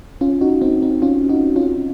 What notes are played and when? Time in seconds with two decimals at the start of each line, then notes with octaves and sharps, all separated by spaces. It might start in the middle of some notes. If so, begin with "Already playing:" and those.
0.21 C#4 F4
0.41 D#4 F#4
0.62 C4 D#4
0.82 C4 D#4
1.02 C#4 F4
1.29 D#4 F#4
1.56 C#4 F4